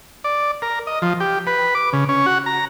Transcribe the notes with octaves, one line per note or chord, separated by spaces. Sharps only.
D5
A#4
D#5
F3
G4
B4
D6
C#3
C#4
F#4
A#5